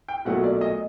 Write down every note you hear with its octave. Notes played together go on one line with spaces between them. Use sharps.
G5
B1 A#2 F#3 A3 F#5
D5
D#5